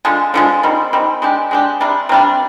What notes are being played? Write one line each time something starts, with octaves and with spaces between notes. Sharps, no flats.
D3 F3 G#3
D3 F3 G#3
D#3 G3 C4
D#3 G3 C4
G#3 D4 G4
G#3 D4 G4
C3 G3 D4
C3 G3 D4